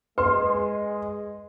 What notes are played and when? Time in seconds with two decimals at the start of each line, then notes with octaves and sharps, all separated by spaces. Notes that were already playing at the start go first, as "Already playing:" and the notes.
0.18 G#3 B4 C6